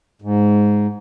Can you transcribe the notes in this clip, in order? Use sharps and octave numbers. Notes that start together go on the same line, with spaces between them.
G#2